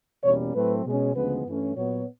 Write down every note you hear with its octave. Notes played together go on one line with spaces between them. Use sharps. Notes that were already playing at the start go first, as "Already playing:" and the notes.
E2 B2 G3 A#3 C#4 C#5
A2 F#3 A3 C4 B4
B2 G#3 C#4
D2 C#3 F3 G#3 B3 B4
G2 E3 A3 C#4
A#2 F#3 B3 C#5